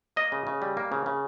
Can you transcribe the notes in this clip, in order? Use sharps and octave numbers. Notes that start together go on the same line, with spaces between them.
A#3 D#5
C#3
C#3
G3
A#3
C#3
C#3